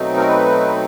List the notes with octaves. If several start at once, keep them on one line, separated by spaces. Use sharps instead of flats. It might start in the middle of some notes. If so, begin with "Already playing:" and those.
Already playing: B2 F#3 A3 C4 D#4
A#4
B4